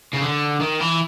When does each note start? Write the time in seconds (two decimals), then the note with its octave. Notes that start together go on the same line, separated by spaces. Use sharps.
0.13 C#3
0.21 D3
0.61 D#3
0.81 E3